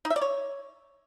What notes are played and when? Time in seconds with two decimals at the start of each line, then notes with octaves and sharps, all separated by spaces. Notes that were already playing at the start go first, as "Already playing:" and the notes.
0.05 D#4
0.10 E5
0.16 D5
0.21 C#5